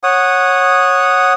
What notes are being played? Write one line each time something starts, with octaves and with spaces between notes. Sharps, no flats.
C#5 F#5 D#6